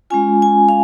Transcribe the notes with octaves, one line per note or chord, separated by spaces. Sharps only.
G#3 C#4 F4 G#5
G#5
F5